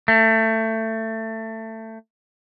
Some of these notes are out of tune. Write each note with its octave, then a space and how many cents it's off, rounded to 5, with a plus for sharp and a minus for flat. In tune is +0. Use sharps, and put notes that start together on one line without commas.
A3 +20